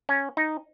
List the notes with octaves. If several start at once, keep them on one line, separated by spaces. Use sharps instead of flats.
C#4
D#4